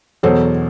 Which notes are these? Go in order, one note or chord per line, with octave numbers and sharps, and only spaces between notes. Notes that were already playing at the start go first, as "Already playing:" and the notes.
E2 B2 F#3 A4 C5